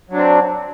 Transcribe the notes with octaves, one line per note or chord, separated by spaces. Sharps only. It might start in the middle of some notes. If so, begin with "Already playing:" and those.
F#3 C4 D4